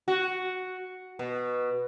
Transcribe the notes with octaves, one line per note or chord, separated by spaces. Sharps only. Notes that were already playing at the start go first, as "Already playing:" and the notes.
F#4
B2